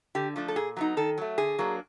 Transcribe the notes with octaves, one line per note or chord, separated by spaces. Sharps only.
D3 G4
F3 A3 D4
A4
A#2 G#4
F#3 B3 D#4
D#3 A4
F#3 A3
D3 G#4
F#3 A#3 D4